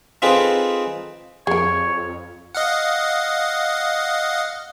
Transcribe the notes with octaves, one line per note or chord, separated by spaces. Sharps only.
C4 D#4 F4 G#4 A4 B4
F2 G#4 A#4 C#5
D#5 F5 F#5